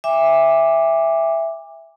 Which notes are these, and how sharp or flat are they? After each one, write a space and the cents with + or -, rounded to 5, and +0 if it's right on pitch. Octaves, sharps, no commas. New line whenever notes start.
E5 +0 G#5 -45 D6 +0